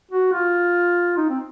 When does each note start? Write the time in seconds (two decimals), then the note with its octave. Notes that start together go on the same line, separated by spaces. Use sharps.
0.11 F#4
0.32 F4
1.17 D#4
1.29 C4